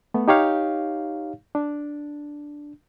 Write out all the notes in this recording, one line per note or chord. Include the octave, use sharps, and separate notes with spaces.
A3 B3
D#4 G4 C#5 F5
D4